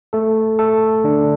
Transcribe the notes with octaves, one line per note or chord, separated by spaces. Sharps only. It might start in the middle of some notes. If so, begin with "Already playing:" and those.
A3 A4
A3 A4
D3 D4